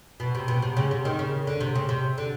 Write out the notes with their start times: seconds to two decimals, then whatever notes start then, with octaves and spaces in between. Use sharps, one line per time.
0.20 B2
0.35 C3
0.48 B2
0.62 C3
0.77 C#3
0.91 C3
1.05 D#3
1.19 C#3
1.47 D3
1.60 C3
1.75 C#3
1.89 C3
2.18 D3